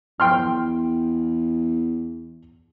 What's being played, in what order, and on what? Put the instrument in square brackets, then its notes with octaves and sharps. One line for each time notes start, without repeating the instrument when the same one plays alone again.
[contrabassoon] E2 [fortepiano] G5 C6 F6